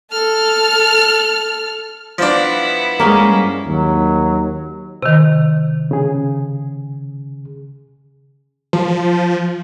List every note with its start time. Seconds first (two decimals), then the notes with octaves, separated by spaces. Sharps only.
0.12 A4 F6
2.18 F3 B3 D4 E4
3.00 G2 G3 G#3 A#3 C#4 G#4
3.65 D#2 F#3
5.03 C3 D#3
5.91 C#3 G#4
8.73 F3